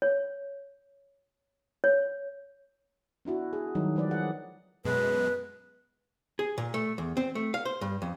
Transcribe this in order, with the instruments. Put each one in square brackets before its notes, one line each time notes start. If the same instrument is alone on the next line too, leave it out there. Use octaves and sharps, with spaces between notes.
[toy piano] C#5
C#5
[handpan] B3 D4 E4 F#4
G#4
D#3 F#3 G3 D#4
F3 G#3 B4 D5
G#4 F#5
[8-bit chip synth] F#2 B2 G#3 [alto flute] B4
[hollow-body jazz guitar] G#4
A#2
A3
E2
C4
A3
F5
C5
G2
F2